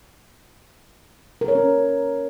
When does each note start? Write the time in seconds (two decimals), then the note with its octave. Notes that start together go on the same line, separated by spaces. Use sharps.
1.41 A#4
1.48 C#5
1.55 C#4